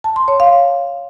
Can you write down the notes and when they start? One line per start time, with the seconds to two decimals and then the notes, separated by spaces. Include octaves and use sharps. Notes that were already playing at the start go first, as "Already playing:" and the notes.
0.04 A5
0.16 C6
0.28 C#5
0.40 F5